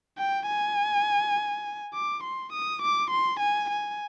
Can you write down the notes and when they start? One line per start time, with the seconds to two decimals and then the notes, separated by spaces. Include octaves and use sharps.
0.18 G5
0.47 G#5
1.94 D6
2.24 C6
2.53 D#6
2.82 D6
3.11 C6
3.40 G#5
3.70 G#5